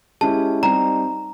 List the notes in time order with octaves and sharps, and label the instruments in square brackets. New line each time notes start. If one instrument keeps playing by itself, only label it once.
[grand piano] G#3 C#4 E4 G4 [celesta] A5
[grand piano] G3 C4 D#4 [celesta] A#5